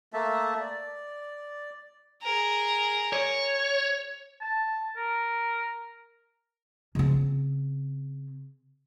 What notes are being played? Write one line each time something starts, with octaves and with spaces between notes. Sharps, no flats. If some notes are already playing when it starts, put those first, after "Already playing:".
A3 A#3 E5 A5
D5
G#4 A#4
C#5
A5
A#4
C#3 C4